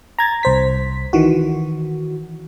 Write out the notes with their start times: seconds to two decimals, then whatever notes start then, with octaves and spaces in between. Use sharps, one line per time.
0.19 A#5 G#6 A6
0.43 C2 C5 B6
1.13 D#3 E3 F#4